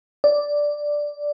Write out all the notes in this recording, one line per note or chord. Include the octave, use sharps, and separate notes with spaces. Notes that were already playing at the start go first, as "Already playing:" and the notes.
D5